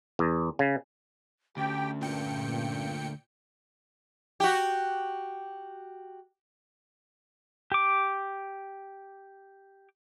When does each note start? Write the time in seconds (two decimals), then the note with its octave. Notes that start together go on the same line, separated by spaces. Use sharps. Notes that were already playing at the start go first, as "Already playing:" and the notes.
0.19 E2
0.59 C#3
1.57 D2 C#4 G4 G5
2.01 G2 A#2 G5 C#7
4.40 F#4 G4
7.72 G4 D6